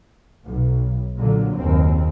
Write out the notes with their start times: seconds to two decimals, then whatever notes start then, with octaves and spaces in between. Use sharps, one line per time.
0.45 B1
1.16 A#2 D3 F#3 A#3
1.55 F#1 D#2 C4